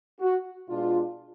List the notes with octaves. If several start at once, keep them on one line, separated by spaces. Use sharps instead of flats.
F#4
B2 G#3 D4 F4